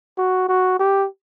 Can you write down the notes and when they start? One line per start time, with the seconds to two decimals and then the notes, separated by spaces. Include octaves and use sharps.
0.18 F#4
0.49 F#4
0.79 G4